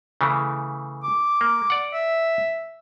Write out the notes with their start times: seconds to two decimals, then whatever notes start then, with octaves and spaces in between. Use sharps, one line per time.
0.21 C#3 E3 A3
1.04 D6
1.41 A#3
1.70 D5 F#5
1.93 E5